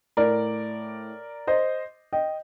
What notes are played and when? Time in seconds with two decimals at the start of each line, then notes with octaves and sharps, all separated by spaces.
0.17 A2 A#4 D5
1.47 C5 D#5
2.13 D#5 G5